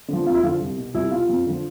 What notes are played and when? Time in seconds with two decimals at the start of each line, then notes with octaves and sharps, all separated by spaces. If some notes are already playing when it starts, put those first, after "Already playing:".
0.08 D3 F3
0.26 F2 F4
0.34 E4
0.43 D3 F3 F4
0.61 C2
0.78 B2
0.94 C2 E4
1.11 B2 F4
1.29 F2
1.46 D3 F3